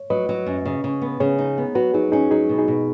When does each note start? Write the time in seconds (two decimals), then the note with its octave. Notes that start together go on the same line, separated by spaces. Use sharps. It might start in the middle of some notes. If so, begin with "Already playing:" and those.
Already playing: C#5
0.10 F#3 B4 D#5
0.29 F#3
0.47 F#2
0.65 C#3
0.84 C#3
1.02 B3
1.20 C#3 G#4 C#5
1.38 D#4
1.58 B3
1.75 F#3 F#4 B4
1.94 F#3 D#4 G#4
2.12 C#4 D#4 G#4
2.31 F#3 D#4 G#4
2.49 B2
2.59 D#4 G#4
2.68 B2